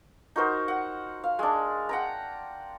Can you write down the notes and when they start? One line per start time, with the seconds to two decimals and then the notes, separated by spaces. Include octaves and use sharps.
0.36 D#4 F#4 A#4 C5
0.68 F#5
1.24 F5
1.39 G#3 D4
1.89 F#5 G5 A#5